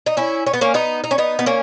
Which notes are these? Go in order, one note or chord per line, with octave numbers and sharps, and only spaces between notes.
D#4
C#4 E4
C#4
B3
A#3 C#4
B3 D#4
D#4
C#4
B3 D#4
B3
A#3 C#4